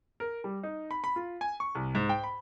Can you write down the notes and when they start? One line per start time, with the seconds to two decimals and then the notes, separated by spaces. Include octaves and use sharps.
0.20 A#4
0.44 G3
0.63 D#4
0.91 B5
1.04 B5
1.16 F4
1.41 G#5
1.60 C#6
1.75 C2
1.95 G#2
2.09 G5
2.24 B5